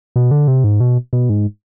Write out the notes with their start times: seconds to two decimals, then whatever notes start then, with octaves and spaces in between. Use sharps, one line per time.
0.16 B2
0.31 D3
0.47 C3
0.64 G#2
0.80 B2
1.13 B2
1.29 G#2